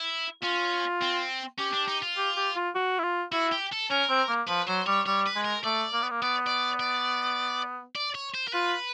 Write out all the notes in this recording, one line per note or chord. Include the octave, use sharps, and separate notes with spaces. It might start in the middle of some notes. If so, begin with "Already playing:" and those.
Already playing: E4
C#4 F4
C4
C#4 G4
D4
D#4
F4
G4
G4
F4
F#4
E4
F4
E4 F#4
G4
A4
C#4 A#4
C4
A#3
F3 B4
F#3 C5
G3 C#5
G3 C#5
B4
G#3
A#4
A3 D5
A#3
B3
A#3
B3 D5
D5
D5
D5
C#5
C5
A#4
F4 B4